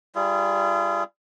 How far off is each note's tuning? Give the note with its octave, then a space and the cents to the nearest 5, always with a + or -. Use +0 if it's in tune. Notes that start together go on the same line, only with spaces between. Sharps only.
G3 +0 F4 -40 G#4 +15